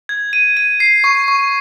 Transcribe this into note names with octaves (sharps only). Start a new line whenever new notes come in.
G#6
D#7
D#7
C7
C#6
C#6